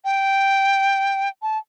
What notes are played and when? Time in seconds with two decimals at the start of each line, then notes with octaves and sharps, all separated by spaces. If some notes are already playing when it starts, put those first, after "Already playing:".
0.05 G5
1.42 A5